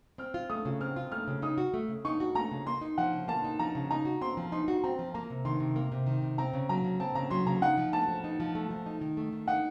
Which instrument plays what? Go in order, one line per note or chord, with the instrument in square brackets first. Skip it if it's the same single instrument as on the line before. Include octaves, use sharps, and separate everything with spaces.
[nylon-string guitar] C4 [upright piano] F6
[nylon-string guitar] F4
[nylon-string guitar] A3 [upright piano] D#6
[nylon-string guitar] C#3
[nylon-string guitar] C4 [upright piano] F6
[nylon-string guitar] F4
[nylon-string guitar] A3 [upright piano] F6
[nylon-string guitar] C#3
[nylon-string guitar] D#4 [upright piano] D#6
[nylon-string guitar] F#4
A3
C#3
[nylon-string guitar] D#4 [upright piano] C#6
[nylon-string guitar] F#4
[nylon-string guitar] A3 [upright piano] A#5
[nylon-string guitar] C#3
[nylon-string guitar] A#3 [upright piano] C6
[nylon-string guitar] D#4
[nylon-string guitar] F3 [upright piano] F#5
[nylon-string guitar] C#3
[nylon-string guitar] A#3 [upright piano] A5
[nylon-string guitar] D#4
[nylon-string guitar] F3 [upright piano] A#5
[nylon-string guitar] C#3
[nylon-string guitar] D#4 [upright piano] A#5
[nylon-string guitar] F#4
[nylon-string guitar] C4 [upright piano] C6
[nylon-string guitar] F3
[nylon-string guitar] D#4 [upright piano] C6
[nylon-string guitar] F#4
[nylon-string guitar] C4 [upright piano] A#5
[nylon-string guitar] F3
[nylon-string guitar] A#3 [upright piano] A#5
[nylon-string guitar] C3
[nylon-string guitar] D#3 [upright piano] C6
[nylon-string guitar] C3
A#3
C3
D#3
C3
[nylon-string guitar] C4 [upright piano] A#5
[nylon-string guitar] C#3
[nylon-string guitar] F#3 [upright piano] A#5
[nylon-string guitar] C#3
[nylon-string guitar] C4 [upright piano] A5
[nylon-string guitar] C#3 [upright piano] A#5
[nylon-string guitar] F#3 [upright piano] C6
[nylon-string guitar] C#3 [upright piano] A#5
[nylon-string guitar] D#4 [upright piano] F#5
[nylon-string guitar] F3
[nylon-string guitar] A3 [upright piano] A5
[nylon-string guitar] F3
D#4
F3
A3
F3
D#4
D#3
A3
D#3
[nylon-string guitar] D#4 [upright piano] F#5